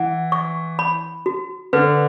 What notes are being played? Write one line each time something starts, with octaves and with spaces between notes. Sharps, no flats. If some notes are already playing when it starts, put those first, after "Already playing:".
Already playing: E3 F#5
C#6
B5
F#4
D3 B4